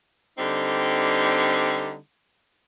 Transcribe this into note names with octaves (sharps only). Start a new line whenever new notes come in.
D3 G3 C4 D#4